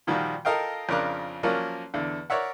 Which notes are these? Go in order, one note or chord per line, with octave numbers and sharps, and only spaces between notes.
A#2 D#3 F3 G3 F4 F#4
F4 A4 A#4 D#5 F5 G5
F2 C#3 D4 A#4 D6 F#6
F3 F#3 A#3 C#4 A#4 D5
E2 D3 D4
A#4 C#5 D5 E5 F#5